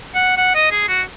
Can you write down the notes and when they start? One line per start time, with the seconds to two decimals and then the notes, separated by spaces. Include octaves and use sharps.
0.15 F#5
0.37 F#5
0.55 D#5
0.71 G#4
0.88 F#4